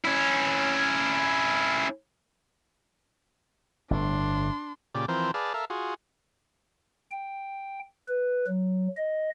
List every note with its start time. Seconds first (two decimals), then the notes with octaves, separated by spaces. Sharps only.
0.05 C#4 E4
3.91 G1 A2 D4 C6
4.95 A#2 C#3 G4 D5
5.08 E3 F3 C4 A#4 C5
5.34 G#4 B4 D5 F5 A5
5.54 A4 A#4 E5 F5
5.70 F4 F#4 G#4
7.11 G5
8.09 B4
8.48 F#3
8.97 D#5